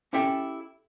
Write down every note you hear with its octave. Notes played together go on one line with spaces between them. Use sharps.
C#4 E4 G4 A4 E5 G5